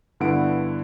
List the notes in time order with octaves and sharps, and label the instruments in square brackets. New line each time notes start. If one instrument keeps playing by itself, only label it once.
[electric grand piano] G2 D3 B3 E4 F#5 D7